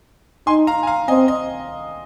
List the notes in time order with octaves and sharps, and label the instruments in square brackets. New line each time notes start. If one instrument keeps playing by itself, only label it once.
[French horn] D#4 [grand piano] G#5 C6
[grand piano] F5 A#5
G#5
F5 A#5
[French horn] C4 [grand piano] D#5 G#5
[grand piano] D#5